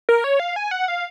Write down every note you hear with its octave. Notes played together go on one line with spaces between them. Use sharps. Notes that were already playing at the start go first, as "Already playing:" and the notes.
A#4
C#5
F5
G#5
F#5
F5